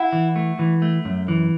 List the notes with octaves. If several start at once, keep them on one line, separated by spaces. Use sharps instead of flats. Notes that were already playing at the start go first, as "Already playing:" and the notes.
Already playing: E4 F#5
E3
A3
E3
A3
F#2
E3